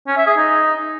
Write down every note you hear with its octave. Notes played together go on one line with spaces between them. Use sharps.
C#4
E5
G#4
D#4